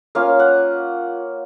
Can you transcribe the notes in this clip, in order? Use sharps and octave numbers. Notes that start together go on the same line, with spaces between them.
A#3 C#4 F4 F5
F#5